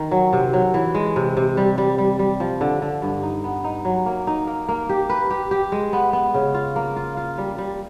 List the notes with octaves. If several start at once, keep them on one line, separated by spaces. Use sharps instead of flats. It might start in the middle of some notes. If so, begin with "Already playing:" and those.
Already playing: D#3
F#3
C3
F#3
E3
G#3
C3
C3
G3
G3
G3
G3
F3
D3
D3
G2
D#4
B3
D#4
F#3
A#3
D#4
A#3
A#3
G4
B4
G4
G4
G#3
B3
B3
C#3
F4
A#3
F4
F4
G3
G3